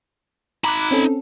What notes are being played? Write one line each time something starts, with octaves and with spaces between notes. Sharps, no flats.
D#4 A#5 B5 D6 F#6
C4 C#4 A4